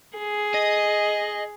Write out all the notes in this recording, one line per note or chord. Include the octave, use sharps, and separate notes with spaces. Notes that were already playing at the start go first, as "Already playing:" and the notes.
G#4
D#5